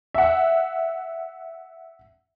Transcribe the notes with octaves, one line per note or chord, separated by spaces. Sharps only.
E5 F#5